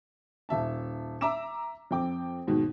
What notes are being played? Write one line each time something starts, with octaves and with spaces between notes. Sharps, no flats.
D#1 E5 A5
E5 A#5 D6 E6 E7
F2 C4 G5 D6
D#2 G#2 B2 D#3